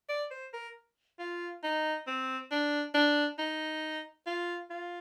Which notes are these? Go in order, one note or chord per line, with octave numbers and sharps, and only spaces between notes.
D5
C5
A#4
F4
D#4
C4
D4
D4
D#4
F4
F4